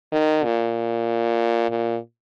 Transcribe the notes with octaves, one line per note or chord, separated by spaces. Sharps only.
D#3
A#2
A#2